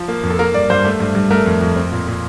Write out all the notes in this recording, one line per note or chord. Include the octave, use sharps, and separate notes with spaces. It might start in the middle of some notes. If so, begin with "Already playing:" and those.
Already playing: F3
A#3
F2
A4
A#3 A#4
G2 D5
G2 C5
A3
G2
G2
A3 A#4
F2
F2
C4
A#2
A#2